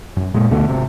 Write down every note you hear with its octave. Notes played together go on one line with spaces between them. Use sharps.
F#2
A#2 G#3
D2 B2 D3 A3
G#1 C3